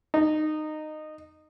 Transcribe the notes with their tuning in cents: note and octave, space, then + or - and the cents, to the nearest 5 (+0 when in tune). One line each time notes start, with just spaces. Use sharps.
D#4 -15